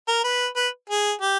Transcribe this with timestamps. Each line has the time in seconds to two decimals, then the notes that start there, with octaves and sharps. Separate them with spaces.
0.08 A#4
0.24 B4
0.56 B4
0.90 G#4
1.21 G4